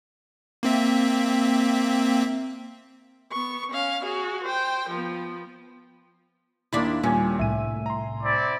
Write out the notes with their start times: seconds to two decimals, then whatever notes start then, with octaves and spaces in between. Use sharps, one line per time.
0.63 A#3 C4 E5
3.32 B3 C#6
3.72 C#4 F5
4.03 F#4 G#4
4.44 C5 G5
4.89 F3 B3
6.73 D#2 A#3 D4 E4 D5 C6 B6
7.04 D#2 A#2 G3 C#4
7.39 C2 A2 E5 G#5 D#7
7.86 A#5 C6
8.24 C4 E4 D5